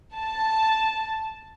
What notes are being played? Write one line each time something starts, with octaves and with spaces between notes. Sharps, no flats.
A5